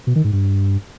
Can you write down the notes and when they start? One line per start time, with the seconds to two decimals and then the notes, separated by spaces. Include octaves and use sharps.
0.07 B2
0.16 D#3
0.24 G#2
0.33 G2